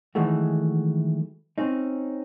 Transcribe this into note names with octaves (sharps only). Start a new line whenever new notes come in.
D#3 E3 F#3 G#3 A3 F#4
C4 C#4 D#4